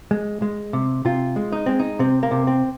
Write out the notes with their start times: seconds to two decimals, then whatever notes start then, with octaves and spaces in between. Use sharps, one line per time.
0.11 G#3
0.42 G#3
0.73 C3
1.05 C3 F4
1.36 G#3
1.52 D#4
1.66 G#3 C4
1.79 D#4
1.99 C3 C4
2.23 A#3
2.31 C3
2.47 C4